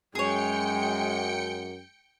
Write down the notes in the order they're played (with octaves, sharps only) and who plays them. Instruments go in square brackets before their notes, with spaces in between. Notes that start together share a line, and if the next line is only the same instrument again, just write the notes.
[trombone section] F#2 [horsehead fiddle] G#3 [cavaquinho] G#4 C#5 [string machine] G5 C#7